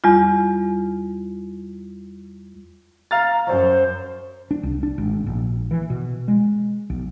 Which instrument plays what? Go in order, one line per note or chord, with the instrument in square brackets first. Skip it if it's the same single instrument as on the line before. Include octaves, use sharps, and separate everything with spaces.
[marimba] E2 G3 F4
[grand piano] F5 F6 A6 [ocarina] A#5
[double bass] F#2 [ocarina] C5
[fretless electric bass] D4
C2
D4
G#1
A#1
E3
B2
G#3
B1